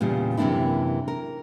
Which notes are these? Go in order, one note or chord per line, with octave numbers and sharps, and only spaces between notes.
E2 A#2 C#3 G3
F#2 C3 E3 A#3 D4 E4
A#4